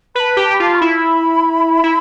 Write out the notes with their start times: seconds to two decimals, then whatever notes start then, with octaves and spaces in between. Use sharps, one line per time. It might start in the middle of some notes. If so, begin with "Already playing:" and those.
0.15 B4 A5 B5
0.37 G4
0.44 A5
0.54 B5
0.60 F4 A5
0.75 C#6
0.79 E4 B5
1.84 E4